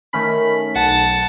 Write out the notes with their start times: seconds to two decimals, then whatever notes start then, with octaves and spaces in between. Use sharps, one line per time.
0.13 D#3 A3 C#4 B5
0.76 B1 F#5 A5